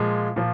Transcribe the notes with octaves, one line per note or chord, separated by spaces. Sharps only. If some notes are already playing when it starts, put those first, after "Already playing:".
Already playing: A#2 F3 G#3
A#2 F3